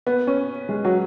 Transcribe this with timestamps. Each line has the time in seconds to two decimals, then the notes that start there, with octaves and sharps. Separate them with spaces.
0.07 B3
0.27 C#4
0.69 G#3
0.85 F#3